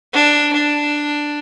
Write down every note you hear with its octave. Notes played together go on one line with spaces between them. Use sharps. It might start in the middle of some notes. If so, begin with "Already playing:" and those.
D4
D4